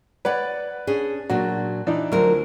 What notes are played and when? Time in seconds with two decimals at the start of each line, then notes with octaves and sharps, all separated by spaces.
0.25 B4 C#5 D5 F#5
0.87 C#4 D4 G#4
1.30 A#2 F#3 D4 F#4
1.87 E3 D4 D#4
2.12 D2 F3 F#3 A#4